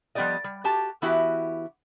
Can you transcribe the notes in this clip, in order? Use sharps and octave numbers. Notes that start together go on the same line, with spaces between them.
F3 G3 B3 G4 D5 D#5
G3
F#4 G4 A5
E3 B3 E4 F#4 G4